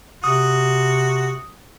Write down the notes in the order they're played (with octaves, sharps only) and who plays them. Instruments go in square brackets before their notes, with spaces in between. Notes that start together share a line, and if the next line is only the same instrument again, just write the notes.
[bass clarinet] C3 [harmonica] F#4 [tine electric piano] D#6